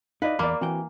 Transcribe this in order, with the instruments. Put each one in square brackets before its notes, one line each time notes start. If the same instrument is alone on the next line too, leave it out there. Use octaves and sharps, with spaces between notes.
[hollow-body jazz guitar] D#4 [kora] B4 [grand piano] D5 D#5 F5
[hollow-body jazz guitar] E2 [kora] A#3 [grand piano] D5 B5
[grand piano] E3 [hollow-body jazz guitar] C4 F#4 G5